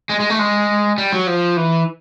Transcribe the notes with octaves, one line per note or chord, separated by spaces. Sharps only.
G#3
G#3
A3
G#3
G3
F#3
F3
E3